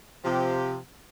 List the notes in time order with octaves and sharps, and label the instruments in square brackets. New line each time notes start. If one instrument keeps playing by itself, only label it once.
[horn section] C3 F3 G4